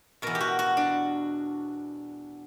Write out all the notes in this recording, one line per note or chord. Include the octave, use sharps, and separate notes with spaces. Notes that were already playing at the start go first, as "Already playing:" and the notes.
E2 B2 A#4
G4
F#4
F#4
D4